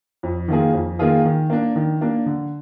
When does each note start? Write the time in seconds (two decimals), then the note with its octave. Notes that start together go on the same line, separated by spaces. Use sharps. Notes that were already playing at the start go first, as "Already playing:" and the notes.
0.23 F2
0.48 D#3 A#3 F4 G#4
0.73 F2
0.99 D#3 A#3 F4 G#4
1.25 D#3
1.50 A#3 D4
1.76 D#3
2.01 A#3 D4
2.26 D3